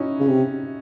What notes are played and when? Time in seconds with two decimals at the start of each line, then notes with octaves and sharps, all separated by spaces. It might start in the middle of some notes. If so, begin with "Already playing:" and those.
Already playing: C#4 D#4 E4 F#4
0.20 C#3
0.28 C3